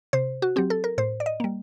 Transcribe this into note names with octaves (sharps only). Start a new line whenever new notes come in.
C3 C5
F#4
F#3 C4 G4
A4
A#4
A2 C5
D5
D#5
G3 A#3